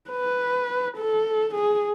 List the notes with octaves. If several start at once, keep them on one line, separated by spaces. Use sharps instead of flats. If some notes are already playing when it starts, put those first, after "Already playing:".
B4
A4
G#4